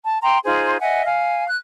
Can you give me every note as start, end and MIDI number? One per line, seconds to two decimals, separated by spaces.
0.04 0.18 81
0.23 0.39 79
0.23 0.39 82
0.23 0.39 84
0.45 0.77 63
0.45 0.77 65
0.45 0.77 68
0.45 0.77 72
0.81 1.03 75
0.81 1.03 76
0.81 1.03 78
0.81 1.03 80
1.05 1.45 77
1.05 1.45 80
1.46 1.56 90